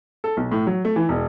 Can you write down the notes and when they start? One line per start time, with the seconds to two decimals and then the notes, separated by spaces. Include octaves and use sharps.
0.24 A4
0.37 B1
0.52 A2
0.67 F#3
0.85 A3
0.96 E3
1.09 E1